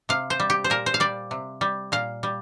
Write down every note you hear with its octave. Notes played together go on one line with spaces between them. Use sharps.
C3 F5
C5
G3
G4
C5
A#2 A#4
C5
F5
G3 D5
C3
G3
A#2 F5
G3